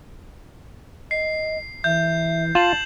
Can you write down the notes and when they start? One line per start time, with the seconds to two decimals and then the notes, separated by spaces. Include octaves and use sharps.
1.11 D#5 C7
1.84 E3 E5 G6
2.55 F4 A5 E7 F#7